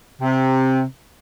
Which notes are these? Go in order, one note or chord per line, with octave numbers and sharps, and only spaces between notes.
C3